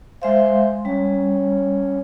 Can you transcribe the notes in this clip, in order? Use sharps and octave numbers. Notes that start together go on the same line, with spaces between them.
G#3 C5 E5 F5
G3 C#4